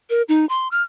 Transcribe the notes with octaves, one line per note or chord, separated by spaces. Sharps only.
A#4
D#4
C6
F6